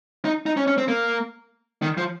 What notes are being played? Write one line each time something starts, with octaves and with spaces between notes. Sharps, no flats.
D#4
D#4
C#4
C#4
C4
A#3
D#3
F3